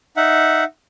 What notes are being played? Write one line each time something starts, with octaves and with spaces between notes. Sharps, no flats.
D#4 E5 F#5